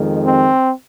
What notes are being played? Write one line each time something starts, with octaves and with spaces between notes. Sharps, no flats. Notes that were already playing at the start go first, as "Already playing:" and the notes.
Already playing: F2 D#3 G#3
C4